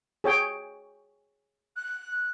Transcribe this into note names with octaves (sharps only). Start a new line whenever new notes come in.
G#4 C#5 G5
F#6